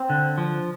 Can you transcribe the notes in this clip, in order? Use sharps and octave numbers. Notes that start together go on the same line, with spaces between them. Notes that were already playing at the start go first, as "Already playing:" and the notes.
Already playing: C4
D3
F3